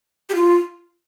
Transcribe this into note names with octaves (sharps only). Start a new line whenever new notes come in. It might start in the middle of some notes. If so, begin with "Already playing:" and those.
G4
F4